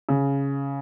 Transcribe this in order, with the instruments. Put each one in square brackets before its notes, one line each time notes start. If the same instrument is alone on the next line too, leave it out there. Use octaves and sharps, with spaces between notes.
[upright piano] C#3